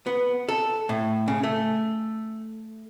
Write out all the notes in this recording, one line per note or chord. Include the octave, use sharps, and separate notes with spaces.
B3
A4
A2
C#3
A3